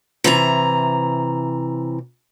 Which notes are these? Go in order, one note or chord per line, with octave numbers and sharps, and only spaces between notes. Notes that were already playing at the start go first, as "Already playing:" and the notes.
C3 E3 A#5